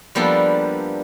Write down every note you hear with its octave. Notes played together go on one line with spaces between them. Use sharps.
F3 G3 A#3 B3 D4 A4